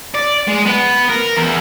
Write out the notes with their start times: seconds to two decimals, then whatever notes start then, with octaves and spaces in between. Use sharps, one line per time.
0.15 D5
0.48 G#3
0.66 B3
1.09 A#4
1.37 E2